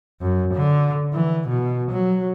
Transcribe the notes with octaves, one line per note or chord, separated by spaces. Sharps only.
F#2
D3
E3
B2
F#3